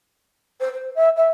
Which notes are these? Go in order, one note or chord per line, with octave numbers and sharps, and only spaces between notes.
C5
C5
E5
E5